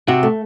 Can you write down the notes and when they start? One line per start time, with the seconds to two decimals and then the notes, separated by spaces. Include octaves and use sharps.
0.08 C3 F#4
0.23 A3